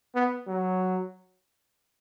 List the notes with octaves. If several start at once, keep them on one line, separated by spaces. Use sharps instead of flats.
B3
F#3